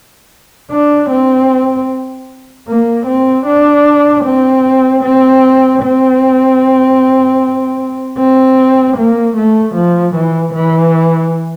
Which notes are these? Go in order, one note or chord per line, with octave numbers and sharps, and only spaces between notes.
D4
C4
A#3
C4
D4
C4
C4
C4
C4
A#3
A3
F3
E3
E3